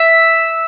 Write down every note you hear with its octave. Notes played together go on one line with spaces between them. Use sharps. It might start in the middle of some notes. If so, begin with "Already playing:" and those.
Already playing: E5